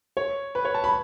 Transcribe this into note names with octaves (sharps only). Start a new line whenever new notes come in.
C#5
B4
C#5
A5
B5